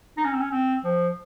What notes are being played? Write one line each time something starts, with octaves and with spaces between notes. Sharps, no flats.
D#4
C#4
C4
C#4
C4
F3